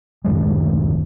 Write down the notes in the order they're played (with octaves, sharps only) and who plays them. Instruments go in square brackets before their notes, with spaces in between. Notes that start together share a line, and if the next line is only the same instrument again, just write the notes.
[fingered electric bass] D1 F#2 D#3 G#3